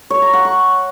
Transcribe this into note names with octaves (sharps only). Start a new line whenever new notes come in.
C#5
A#5
F#5
C#6